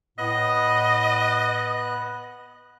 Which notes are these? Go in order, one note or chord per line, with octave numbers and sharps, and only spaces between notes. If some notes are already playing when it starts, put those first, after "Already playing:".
A2 B3 D#5 F#6